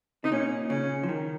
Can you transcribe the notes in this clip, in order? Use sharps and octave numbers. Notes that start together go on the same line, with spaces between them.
C3 D#4
A#2 C#4
C#3 C#4
F3
D#3